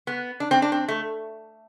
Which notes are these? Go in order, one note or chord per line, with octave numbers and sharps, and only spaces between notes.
B3
D4
C4
D4
C4
A3